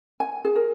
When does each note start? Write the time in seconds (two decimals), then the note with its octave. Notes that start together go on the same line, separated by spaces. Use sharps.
0.20 G#5
0.45 G#4
0.56 A#4